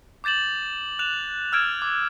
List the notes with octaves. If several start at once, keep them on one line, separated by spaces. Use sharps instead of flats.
D6 G6 A6 E7 F#7
F#6 E7 F7
E6 F6 G#6 D7 E7
D6